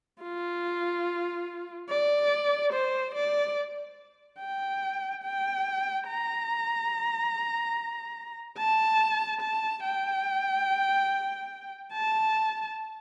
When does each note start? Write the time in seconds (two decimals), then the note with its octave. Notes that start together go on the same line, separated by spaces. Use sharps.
0.23 F4
1.90 D5
2.73 C5
3.15 D5
4.40 G5
5.24 G5
6.08 A#5
8.58 A5
9.42 A5
9.84 G5
11.92 A5